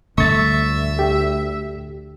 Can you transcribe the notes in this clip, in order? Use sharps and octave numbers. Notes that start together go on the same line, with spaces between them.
D2 D3 G3 A3 E5 C#6 A6
G4